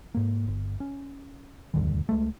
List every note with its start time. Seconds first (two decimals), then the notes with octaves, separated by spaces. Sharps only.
0.15 G#2 A#3
0.48 G1
0.80 C#4
1.74 E1 D2 G2 D#3
2.09 C#2 G#3 A3